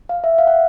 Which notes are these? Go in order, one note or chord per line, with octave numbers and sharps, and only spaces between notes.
F5
E5
F5
F#5